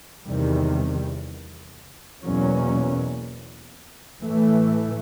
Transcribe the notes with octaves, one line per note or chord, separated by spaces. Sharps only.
E2 C3 D#3 G3
E2 B2 F#3 A#3 C#4
A2 E3 A3